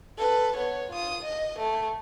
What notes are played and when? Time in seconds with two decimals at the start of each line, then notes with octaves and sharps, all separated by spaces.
0.18 A4 B4
0.56 B3 C#5
0.91 F4 D#6
1.23 D#5
1.59 A3